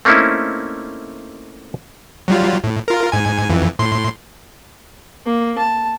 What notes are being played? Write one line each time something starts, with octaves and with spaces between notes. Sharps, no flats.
A3 A#3 C4 C#4 D#4 E4
F#3 G3 F4
A2
F4 A#4
G#2 G#5
F2 E3
A2 C6
A#3
A5